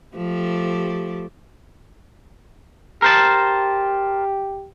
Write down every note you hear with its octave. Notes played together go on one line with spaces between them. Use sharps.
F3 A3 G4
G4 A#4 C5 A5